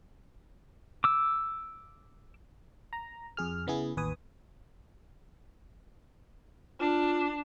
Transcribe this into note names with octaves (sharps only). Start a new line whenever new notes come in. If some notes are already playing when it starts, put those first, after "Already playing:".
D6 E6
A#5
F2 G#4 F6
C#3 B3 E4 G#4
A1 D#2 B4 G#5 D#6
D4 F4